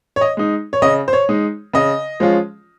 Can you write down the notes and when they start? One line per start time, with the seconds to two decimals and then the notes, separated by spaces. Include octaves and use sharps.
0.16 C#5
0.21 D#5
0.37 G#3 D#4
0.73 C#5
0.82 C#3 D#5
1.08 C5
1.13 C#5
1.29 G#3 D#4
1.73 C#3 D#5
2.20 F3 G#3 C#4 F4